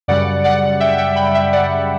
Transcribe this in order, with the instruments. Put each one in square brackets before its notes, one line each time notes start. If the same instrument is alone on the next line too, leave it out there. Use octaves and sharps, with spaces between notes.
[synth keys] F#2 C#3 G3 D5 F#5
D5 F#5
E5 G5
E5 G5
G5 B5
E5 G5
D5 F#5